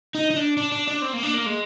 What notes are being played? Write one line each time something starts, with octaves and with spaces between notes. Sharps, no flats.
D#4
D#4
D4
D4
D4
D4
C4
A#3
D4
A#3
G#3